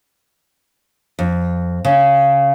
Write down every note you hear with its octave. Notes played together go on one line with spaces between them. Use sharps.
F2
C#3